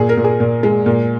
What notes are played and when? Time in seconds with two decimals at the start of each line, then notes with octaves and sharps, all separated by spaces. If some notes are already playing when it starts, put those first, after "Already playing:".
Already playing: A#2 G#4
0.09 A#4
0.17 A#2
0.24 G#4
0.40 A#2
0.63 G#3
0.86 A#2